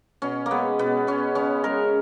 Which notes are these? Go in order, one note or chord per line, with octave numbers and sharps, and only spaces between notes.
B2 C#4
A#3
G#3 B3
B2 B3
G#3 C#4
C#3 C#4
G#3 A#4